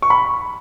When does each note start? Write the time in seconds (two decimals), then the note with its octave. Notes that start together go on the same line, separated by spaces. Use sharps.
0.02 C#6
0.10 B5